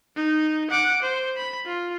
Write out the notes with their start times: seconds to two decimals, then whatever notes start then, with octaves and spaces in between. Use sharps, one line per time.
0.16 D#4
0.70 F#5 D6
1.02 C5
1.37 B5
1.66 F4